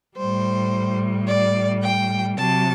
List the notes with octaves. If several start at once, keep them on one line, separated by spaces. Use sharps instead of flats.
G3 C5
A2
D5
G5
C3 F#3 A5